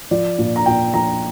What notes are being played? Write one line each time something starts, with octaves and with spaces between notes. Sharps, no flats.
F3 D5
A#2
A#5
A#2 G5
F3 A#5